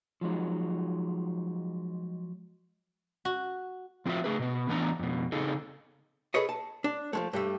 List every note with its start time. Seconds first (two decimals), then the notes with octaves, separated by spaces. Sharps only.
0.21 F3 F#3 G#3 D#4
3.25 F#4
4.06 F3 C4 F4 F#4 E5
4.24 A3 G#4 B4
4.39 B2 B3
4.69 A2 E3 B3 D4 A5 A#5
4.99 F2 B2
5.32 C#3 C4 D#4 G#4 A4
6.34 G#4 A4 B4 C#5 D#5
6.49 A5
6.84 D4
7.13 F3 G#3 A3
7.33 G2 G3 A3